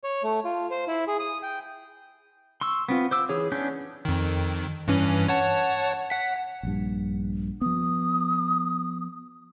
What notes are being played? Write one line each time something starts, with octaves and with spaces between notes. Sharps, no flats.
C#5
A3
F4
C5
E4
G#4
D#6
G5
C6 C#6 E6
B3 C4 F4
C5 D6 E6
E3 G#4 C#5
B3 C#4 D4 C#5 G6
F2 D#3
G2 E3 C#4
C#5 F#5 A5
F#5 B6
A#1 G2
F3 B3 D#6